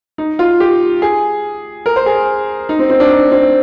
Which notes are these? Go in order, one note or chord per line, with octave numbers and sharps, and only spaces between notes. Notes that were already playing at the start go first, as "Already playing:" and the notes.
D#4
F4
G4
G#4
A#4
C5
G#4
D#4
C4
C4
D4
D#4
C4